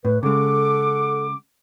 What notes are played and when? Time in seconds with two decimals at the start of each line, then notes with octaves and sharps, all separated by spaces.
0.05 A2 B4
0.23 C#3 G#3 A4 F#5 D6